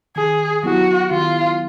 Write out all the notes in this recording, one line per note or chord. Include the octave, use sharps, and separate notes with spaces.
D#3 G#4
F#3 B3 E4 F#4 G4
D#3 F4